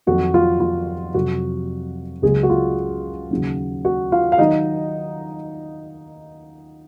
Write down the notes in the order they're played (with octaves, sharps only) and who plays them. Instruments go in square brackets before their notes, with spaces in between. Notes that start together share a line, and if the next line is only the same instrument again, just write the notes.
[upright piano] F2 D#3 F#3 F#4
F4
F4
F2 C3 F#3 F#4
C#2 C#3 F#3 G#3 G#4
F#4
F4
D#2 C#3 F#3
F#4
F4 F5
F5
D#3 F#3 D#4 D#5